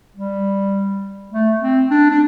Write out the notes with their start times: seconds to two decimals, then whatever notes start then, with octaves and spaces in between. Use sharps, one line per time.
0.16 G3
1.32 A3
1.61 C4
1.91 D4
2.10 D4